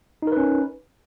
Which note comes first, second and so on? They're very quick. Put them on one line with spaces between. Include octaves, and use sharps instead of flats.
D#4 A#4 B4 C#4